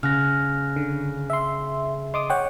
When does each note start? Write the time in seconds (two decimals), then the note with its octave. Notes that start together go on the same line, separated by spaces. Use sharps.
0.03 C#3 F6 F#6 A#6
0.76 D3
1.30 E5 C6
2.14 D#5 C6 D6 D#6
2.30 C#5 F#5 G5